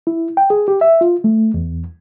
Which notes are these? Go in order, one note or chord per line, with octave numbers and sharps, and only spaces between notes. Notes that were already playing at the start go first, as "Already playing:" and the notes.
E4
G5
G#4
G4
E5
F4
A3
E2